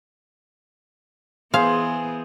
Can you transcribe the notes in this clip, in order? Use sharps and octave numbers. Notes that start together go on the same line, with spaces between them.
E3 B3 G#4 C5 F5